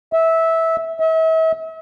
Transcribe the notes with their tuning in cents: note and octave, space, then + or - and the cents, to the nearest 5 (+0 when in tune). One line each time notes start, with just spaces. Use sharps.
E5 -15
E5 -40